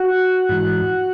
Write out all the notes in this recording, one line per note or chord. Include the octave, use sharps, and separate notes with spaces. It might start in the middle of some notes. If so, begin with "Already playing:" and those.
Already playing: F#4 F#5
G#2 E3